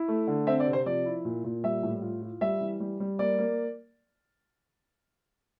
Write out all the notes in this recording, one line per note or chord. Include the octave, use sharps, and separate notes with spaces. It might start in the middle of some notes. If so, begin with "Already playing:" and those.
Already playing: E4
A3
D3
C4 E5
D5
C3
C5
F3 D5
E4
A#2
A#2
G3 E5
A2
F4
F4
G3 E5
E3
G3
G3
A#3 D5
A#3